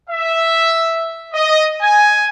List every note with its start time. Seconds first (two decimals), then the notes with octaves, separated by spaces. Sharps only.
0.10 E5
1.34 D#5
1.81 G#5